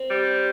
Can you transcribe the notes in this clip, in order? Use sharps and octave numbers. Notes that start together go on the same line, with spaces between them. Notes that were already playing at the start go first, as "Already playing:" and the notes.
Already playing: C4
G3